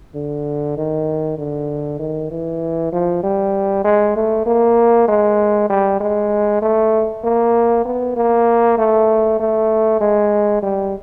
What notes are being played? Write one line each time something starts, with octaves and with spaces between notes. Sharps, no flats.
D3
D#3
D3
D#3
E3
F3
G3
G#3
A3
A#3
G#3
G3
G#3
A3
A#3
B3
A#3
A3
A3
G#3
G3